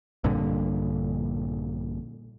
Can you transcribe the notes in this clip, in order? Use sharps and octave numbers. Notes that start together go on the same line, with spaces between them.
A#1 G2 A#2 D3